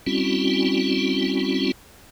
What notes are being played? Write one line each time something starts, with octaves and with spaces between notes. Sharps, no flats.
G3 C4 C#4 E4 F#4